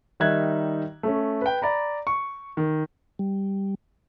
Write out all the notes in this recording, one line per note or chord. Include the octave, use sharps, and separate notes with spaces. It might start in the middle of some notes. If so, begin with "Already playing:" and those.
D#3 G3 D#4 E5 F#6 G#6
A3 C#4
B4 G5
D5 A#5 B5
C#6
D#3
G3